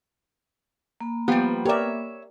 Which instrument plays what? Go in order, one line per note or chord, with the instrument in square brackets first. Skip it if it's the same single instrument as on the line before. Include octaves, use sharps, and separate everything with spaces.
[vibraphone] A#3 B5
[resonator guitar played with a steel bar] F3 G3 [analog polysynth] B3 [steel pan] G4
[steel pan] G4 A#4 D5 [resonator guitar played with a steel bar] C#5 E5